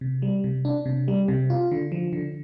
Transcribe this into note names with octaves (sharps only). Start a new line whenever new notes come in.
C3
G3
C3
D4
C3
G3
C3
F4
D3
F3
D3